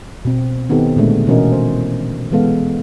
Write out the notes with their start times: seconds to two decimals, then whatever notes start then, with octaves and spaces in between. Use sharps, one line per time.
0.25 B2 C4
0.69 D#3 B3 C4 D#4 G4 A4
0.96 A#2 D3 G#3 A3 D4
1.27 B2 E3 C#4 F#4 A#4 D#5
1.52 C5
2.31 E3 G#3 B3 A4 F5